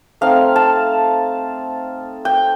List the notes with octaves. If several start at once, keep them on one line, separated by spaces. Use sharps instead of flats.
A3 C4 D#4 F5
A5
G5